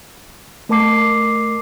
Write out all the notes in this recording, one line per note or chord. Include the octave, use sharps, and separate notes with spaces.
A3 A#4 A5 D6 C7